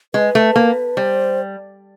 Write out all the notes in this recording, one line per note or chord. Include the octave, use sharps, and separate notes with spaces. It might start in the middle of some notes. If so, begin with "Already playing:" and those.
G#3 B4
A3
A#3
G3 C5